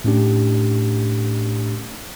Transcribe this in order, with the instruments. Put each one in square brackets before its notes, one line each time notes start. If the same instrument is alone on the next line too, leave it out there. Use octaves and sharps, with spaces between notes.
[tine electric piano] A2 A3 C#4 D4 G4